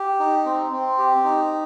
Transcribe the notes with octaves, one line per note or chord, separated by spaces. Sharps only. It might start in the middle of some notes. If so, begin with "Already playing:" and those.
Already playing: G4
D#4
C4
C4
G4
D#4